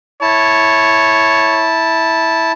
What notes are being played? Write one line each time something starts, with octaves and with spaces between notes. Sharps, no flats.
E4 C#5 A5